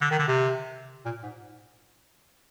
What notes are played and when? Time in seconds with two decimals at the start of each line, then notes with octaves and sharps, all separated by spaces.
0.01 D3
0.11 D#3
0.19 D3
0.28 C3
1.05 A#2
1.23 G#2